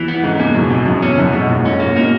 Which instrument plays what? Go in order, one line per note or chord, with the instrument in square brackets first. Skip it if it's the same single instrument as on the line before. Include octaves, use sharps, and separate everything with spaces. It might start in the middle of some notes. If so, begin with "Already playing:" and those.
Already playing: [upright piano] E2 [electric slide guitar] E3
[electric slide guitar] B3
[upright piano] G#2 [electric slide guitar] C#3
[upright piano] E2 [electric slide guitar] A#3
[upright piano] F#2 [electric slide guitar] B2
[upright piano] E2 [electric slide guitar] B2
[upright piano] F#2 [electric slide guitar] C#3
[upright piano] E2 [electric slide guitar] C#4
[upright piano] F#2 [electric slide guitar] B2
[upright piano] G#2 [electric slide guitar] B2
[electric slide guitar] F#2 [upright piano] A#2
[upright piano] G#2 [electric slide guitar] C#4
[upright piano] G#2 [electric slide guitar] A#3
[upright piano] B2 [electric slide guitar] A#3